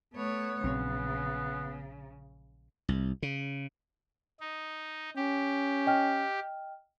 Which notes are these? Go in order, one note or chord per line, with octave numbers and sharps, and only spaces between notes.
A3 B3 C#5
A#1 C#3 F#3 C4
C2
C#3
D#4
C#4 G4
D#5 G5 F6